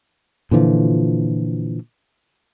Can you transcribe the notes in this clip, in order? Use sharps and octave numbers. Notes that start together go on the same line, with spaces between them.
A#2 D3 E3 F3